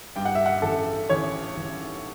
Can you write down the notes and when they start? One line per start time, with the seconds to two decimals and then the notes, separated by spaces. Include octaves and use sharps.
0.16 G2 G5
0.25 F#5
0.35 E5
0.46 F#5
0.62 A1 A4
1.09 A1 C#5
1.57 A1